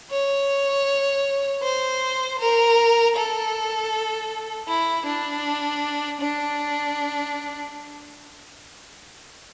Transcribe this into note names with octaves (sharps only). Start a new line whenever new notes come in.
C#5
C5
A#4
A4
E4
D4
D4